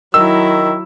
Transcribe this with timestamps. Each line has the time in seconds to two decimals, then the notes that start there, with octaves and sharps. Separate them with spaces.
0.14 D#3 F#3 E4 E6